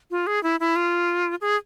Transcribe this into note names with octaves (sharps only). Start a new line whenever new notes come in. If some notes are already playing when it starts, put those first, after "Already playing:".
F4
G#4
E4
E4
F4
G#4